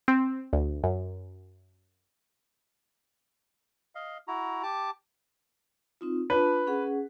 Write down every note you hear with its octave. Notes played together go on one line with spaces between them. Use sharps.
C4
D2
F#2
D#5 F5
E4 F#4 A#5
G4 A5 D6
C4 D#4 F4
D4 F4 B4 A5
C#4 G#4 F#5